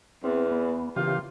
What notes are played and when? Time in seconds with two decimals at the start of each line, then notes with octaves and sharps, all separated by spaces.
0.24 E2 C4
0.51 B3
0.96 C#3 E3 A#3 F4 G4